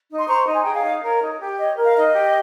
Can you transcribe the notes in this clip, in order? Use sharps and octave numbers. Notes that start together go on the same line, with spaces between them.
D#4
C6
C5 A#5 C#6
D#4 A#5
G#5
G#4 G5 A#5
C#5 F5
D#4
A#4 C#5
D#4
G4
C#5 D#5
A#4
F5
D#4 D#5
G4